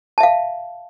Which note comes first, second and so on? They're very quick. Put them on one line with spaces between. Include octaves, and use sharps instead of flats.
A5 E5 F5